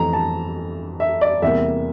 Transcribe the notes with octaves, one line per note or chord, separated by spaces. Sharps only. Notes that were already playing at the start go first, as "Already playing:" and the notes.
Already playing: F2 E3 A3 C4 A#5
A5
E5
D5
E2 C3 G3 A#3 E5